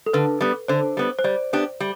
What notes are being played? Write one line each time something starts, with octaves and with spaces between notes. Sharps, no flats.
A4
D3 B4
G3 B3
D3 C5
G3 B3
C5
G3 D5
B3 D4 G4
G3